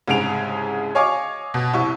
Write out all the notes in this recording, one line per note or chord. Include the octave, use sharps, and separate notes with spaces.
C2 G#2 C#3 G#4 D7 F7
C#5 D#5 F5 G#5 C#6 D6
B2
C2 E4 C#6